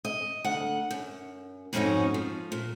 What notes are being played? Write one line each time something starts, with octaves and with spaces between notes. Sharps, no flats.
D#5
D2 F#5
F#2
F2 G#2 G#3 C#4 D#4 F#4
F3
A#2